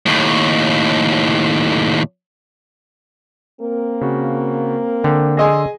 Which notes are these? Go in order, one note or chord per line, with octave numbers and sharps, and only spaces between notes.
D#2 A2
A#3 C4 A#4
C#3 F#4
D3 G5
G#4 D#5 G#5 C6 E6 A#6